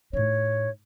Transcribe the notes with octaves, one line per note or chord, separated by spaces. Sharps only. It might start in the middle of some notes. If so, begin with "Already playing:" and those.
A2 D#4 C#5